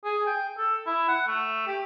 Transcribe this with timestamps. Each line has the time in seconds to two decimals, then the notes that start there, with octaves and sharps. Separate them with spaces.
0.05 G#4
0.27 G5
0.58 A4
0.86 E4
1.08 F#5
1.27 A3
1.67 G4